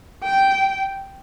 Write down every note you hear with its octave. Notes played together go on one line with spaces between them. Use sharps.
G5